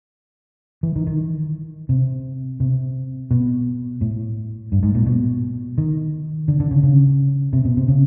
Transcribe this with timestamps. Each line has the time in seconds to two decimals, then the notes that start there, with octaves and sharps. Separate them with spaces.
0.83 E3
0.96 D#3
1.07 D#3
1.89 C3
2.60 C3
3.31 B2
4.01 A2
4.72 G2
4.83 G#2
4.95 A#2
5.06 B2
5.78 D#3
6.48 D3
6.60 D3
6.71 C#3
6.83 C#3
7.53 C3
7.65 B2
7.77 C3
7.88 C#3